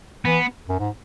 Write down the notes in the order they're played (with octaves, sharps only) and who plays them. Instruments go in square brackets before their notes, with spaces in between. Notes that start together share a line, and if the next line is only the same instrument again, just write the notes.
[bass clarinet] E3 [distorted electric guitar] B3
[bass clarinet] F#2
G#2